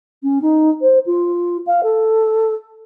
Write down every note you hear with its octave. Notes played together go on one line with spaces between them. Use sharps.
C#4
D#4
C5
F4
F5
A4